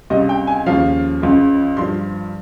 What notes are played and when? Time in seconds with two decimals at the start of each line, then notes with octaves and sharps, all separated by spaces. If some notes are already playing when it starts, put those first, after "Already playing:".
0.10 C#2 C3 G3 D#5
0.29 G5
0.47 G#5
0.66 D#2 C#3 F3 F5
1.22 C#2 C#3 F3
1.76 G2 F3 C6